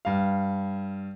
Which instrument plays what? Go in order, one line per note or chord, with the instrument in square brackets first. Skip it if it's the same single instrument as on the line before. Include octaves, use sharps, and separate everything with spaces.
[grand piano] G2 F5